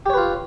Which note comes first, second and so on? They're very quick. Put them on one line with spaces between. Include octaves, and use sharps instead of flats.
G4 C#5 B4 F4